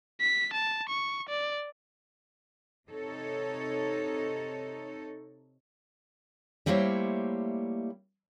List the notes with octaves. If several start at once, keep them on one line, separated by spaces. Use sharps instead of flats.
B6
A5
C#6
D5
C3 D#4 A4 C#5
G3 A3 A#3 E4 C5 C#5